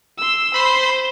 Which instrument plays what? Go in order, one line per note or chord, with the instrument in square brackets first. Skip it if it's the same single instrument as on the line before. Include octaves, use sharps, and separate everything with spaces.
[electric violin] C6 E6
[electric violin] C5 [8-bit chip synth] B5 C6